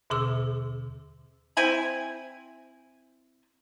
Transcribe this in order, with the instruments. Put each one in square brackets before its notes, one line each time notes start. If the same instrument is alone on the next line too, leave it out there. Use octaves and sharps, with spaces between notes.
[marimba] D#2 B2 D3 G#4 D6 E6
[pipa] C4 E4 G#5 B5